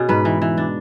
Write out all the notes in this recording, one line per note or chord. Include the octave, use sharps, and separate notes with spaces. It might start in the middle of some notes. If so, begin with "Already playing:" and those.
Already playing: B2 C#4 G#4
G#2 B4
E3
E3
D4